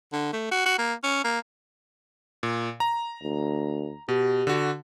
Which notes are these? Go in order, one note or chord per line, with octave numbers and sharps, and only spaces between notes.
D3
A3
F#4
F#4
A#3
C#4
A#3
A#2
A#5
D2
B2 G4
D3 F#4